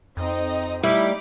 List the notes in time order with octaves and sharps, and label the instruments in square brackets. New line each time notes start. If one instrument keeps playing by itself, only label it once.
[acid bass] F2 [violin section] C4 D#4 D#5
[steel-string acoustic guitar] G3 [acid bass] A3 [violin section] D#4 B5 D6 [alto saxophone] E4